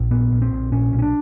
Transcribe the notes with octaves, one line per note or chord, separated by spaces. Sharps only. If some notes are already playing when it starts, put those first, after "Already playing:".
Already playing: A#1
A#2 B3
A#1
C4
A#1
A#2 C#4
B1
C#4
D4